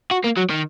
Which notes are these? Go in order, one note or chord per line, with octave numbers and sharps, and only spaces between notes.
F#4
A#3
F#3
D#3